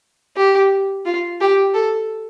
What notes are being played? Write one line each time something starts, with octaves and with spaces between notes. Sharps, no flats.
G4
F4
G4
A4